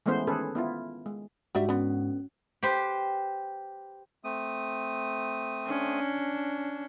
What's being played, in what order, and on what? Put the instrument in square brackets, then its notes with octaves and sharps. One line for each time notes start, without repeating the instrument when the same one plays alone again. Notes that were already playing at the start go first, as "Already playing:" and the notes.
[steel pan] E3 G#3 A3 B3 C#4 C5
D#3 C#4 G#4 A4 B4
B3 E4 F4
G#3
[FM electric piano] G#2 F#4 [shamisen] G3 D4 E5
[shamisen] D3 B3 [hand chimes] C#4
[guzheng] G4 B4 C5
[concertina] A3 C4 D#6
[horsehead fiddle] C#4 D4